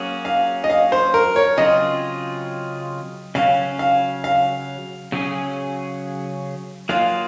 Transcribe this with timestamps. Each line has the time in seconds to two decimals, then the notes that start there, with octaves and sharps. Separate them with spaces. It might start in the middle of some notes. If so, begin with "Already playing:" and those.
Already playing: F#3 A#3 C#4 G#4
0.25 F5
0.64 D#5
0.70 F5
0.92 C5
1.14 A#4
1.36 C#5
1.58 C#3 F#3 C4 F4 G#4 D#5
3.35 C#3 F#3 C#4 F5
3.79 F5
4.24 F5
5.12 C#3 F#3 C#4 G#4
6.89 F#3 A#3 F4 G#4 F5